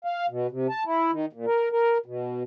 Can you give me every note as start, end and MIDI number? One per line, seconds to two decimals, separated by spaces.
0.05 0.26 77
0.30 0.47 47
0.51 0.67 48
0.69 0.84 81
0.85 1.11 64
1.11 1.26 51
1.33 1.46 46
1.46 1.69 70
1.72 1.98 70
2.06 2.43 47